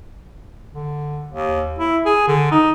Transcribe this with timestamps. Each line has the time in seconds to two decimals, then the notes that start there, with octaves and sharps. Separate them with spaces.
0.75 D3
1.31 D#2
1.79 E4
2.05 G#4
2.28 D3
2.52 D#4